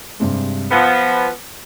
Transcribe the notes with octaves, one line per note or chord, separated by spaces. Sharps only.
G2 C3 G#3
F3 B3 B4 E6